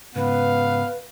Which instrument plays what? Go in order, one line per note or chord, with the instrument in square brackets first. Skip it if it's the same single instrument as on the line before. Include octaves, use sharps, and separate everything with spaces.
[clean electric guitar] G#2 C#3 [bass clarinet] B3 [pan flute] B4 [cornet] F5